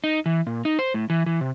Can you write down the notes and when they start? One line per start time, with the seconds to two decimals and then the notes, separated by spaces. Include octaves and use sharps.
0.04 D#4
0.26 E3
0.47 A#2
0.65 D#4
0.79 C5
0.94 A2
1.10 E3
1.26 E3
1.41 C3